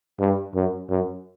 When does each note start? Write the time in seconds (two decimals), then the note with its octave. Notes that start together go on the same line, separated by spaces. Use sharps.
0.20 G2
0.55 F#2
0.90 F#2